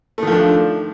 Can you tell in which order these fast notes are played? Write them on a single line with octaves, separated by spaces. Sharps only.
A3 D#3 F3 D4